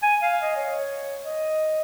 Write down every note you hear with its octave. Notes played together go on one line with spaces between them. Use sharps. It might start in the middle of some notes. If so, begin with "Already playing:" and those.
G#5
F5
D#5
C#5
C#5
D#5